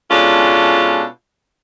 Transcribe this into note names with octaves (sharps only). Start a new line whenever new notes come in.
B2 G#3 C#4 D4 F4 A4